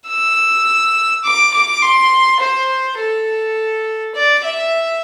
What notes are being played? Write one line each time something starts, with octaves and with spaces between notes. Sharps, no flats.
E6
D6
D6
C6
C5
A4
D5
E5